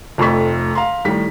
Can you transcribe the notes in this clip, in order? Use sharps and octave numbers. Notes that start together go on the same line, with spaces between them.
F1 F2 A3 B5 C#6 B6
F5 A#5 C6
A2 D#3 G3 B6